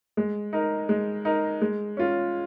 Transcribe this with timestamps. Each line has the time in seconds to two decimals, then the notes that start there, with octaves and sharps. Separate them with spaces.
0.17 G#3
0.53 D#4 A#4
0.89 G#3
1.25 D#4 A#4
1.61 G#3
1.97 C#4 F4